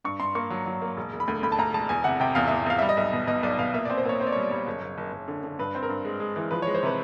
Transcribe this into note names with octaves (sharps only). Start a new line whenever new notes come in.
G2 C#6
G2 C6
A#3 C#6
F#3
F#3
A#3
E1
E1
B5
D2
D2 B5
A5
D2 A#5
E1 A5
E2 G#5
C3 F#5
C3 G5
E2 F5
E5
E2
E2 F5
G3 E5
D#5
B1 E5
B2
B2 D#5
B1 D5
B2 F5
A#2 E5
D5
C4
C5
A#2 C#5
C4 C5
D5
C#5
G3
D5
G3 C#5
F#1
F#1
F#1
F#1
D3
D3
G2 B4
C4
A#4
G2
G#3
G#3
E3
F3 B4
C#5
G#3
C5
C3 B4